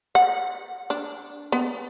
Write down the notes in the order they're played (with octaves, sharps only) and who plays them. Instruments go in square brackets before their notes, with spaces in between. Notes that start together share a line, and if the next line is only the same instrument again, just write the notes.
[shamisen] F#5
D4
B3